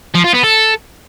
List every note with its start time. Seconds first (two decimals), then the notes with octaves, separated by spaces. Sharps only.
0.15 F3
0.25 F4
0.34 B3
0.44 A4